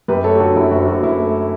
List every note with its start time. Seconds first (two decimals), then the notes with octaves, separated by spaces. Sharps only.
0.08 F#2 G4 B4
0.24 A3 A4 C#5
0.35 G4
0.39 D3 F#4 A4
0.56 F#2 E4 G4
0.71 F#1 F#4
0.87 F#1 F#4
1.03 F#2 E4
1.19 A3